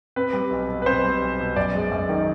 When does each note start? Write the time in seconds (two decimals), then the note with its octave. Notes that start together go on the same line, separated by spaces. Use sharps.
0.16 C4 B4
0.33 G3
0.51 B1
0.69 B2
0.82 B4
0.86 C4 C5
1.03 G3
1.22 B1
1.40 B2
1.56 F#2 D5
1.75 G#3
1.92 F#2
2.09 D#3